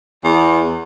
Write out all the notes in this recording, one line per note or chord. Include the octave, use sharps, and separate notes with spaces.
E2